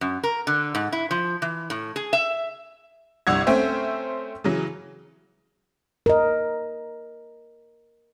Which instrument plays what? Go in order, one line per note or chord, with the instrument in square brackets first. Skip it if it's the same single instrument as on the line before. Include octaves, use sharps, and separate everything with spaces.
[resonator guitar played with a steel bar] F#2
A#4
D3
G#2
E4
F3
E3
A2
G#4
E5
[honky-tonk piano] G1 C2 F#5 E6 G#6
A3 C4 C#4 C5 E5 G5
C#3 E3 F#3
[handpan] A#4 D#5